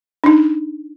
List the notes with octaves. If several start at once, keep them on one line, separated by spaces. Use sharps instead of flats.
D4 D#4